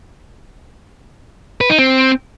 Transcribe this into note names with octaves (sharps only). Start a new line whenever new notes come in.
B4
D#4
C4